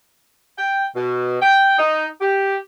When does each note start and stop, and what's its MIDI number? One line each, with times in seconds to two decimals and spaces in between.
0.58 0.84 79
0.95 1.38 47
1.42 1.75 79
1.78 2.06 63
2.21 2.57 67